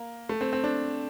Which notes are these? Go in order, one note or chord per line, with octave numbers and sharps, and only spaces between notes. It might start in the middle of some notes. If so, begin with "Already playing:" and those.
Already playing: A#3
A3
C4
C4
D4